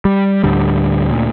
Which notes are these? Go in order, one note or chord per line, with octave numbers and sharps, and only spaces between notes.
G3
D2 A2 D3 G3
D2 A#2